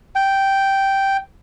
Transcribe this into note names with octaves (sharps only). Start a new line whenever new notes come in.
G5